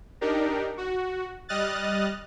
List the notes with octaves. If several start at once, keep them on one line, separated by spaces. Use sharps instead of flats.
D4 D#4 G4 A#4
F#4
G3 D#5 D#6 F6 F#6 A6